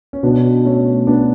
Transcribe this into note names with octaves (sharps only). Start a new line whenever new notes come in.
C#4
B2 B3 D4
A3 C#4
B3 D4